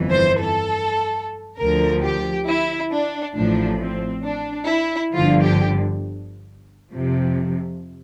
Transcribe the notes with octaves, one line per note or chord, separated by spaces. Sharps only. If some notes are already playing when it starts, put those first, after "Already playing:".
Already playing: G1 F2 E3
C5
A4
D2 D3 F3 A#4
G4
E4
D4
A1 A2 F3 D4
C4
D4
E4
G1 G2 D3 F3 F4
G4
F2 C3 F3